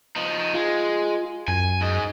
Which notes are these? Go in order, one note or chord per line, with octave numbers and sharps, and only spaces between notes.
F3 D#4
G#3 F4
F#2 G#5
G#2 D#5